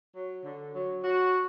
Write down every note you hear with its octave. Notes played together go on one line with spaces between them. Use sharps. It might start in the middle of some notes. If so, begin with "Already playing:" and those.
F#3
D3
F#3
F#3 F#4